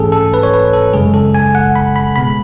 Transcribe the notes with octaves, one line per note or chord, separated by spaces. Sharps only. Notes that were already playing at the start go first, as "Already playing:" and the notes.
Already playing: G#2 E3 A3 C#4 G#4 A4
A4
B4
C#5
B4
A4
F#2 C#3 G#3 G#4
A4
G#5
F#5
B5
B5
B2 G#3 B3 B5